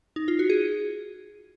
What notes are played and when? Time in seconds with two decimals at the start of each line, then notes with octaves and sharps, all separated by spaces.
0.16 D#4
0.28 F4
0.39 F#4
0.50 G#4